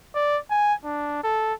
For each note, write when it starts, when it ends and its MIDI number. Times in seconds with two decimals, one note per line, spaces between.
0.15 0.38 74
0.51 0.74 80
0.84 1.21 62
1.24 1.54 69